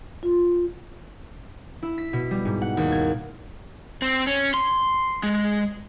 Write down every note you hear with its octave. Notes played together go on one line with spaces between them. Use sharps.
F4
E4
B6
B2
G3
G#2
F#5
D#2
G#6
C4
C#4
C6
G#3